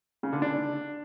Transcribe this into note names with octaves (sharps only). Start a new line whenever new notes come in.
C#3
D3
D4